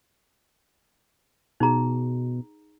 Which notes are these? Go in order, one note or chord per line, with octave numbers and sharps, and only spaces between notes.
B2 D#4 G#4 A#5